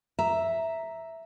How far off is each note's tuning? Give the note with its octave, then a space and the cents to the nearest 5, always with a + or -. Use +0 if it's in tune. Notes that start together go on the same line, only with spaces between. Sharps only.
E5 +0 A#5 +0